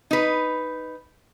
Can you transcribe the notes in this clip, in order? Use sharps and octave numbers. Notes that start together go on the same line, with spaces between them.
D#4 B4